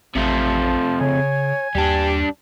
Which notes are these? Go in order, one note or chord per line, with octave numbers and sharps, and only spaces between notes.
A1 C3 F3 A3
C#3 C#5 G#5
D#2 G3 D4 G4